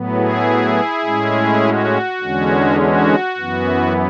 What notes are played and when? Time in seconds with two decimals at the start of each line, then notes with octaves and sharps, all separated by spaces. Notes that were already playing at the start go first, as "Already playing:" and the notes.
Already playing: A2 F#3 B3
0.16 E4 G#4
1.04 A2 G#3 C#4
1.62 F#4
2.21 E2 D3 G#3 C#4
2.80 F#4
3.38 F#2 E3 B3